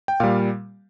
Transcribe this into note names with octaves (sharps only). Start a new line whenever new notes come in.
G5
A#2 G3 F5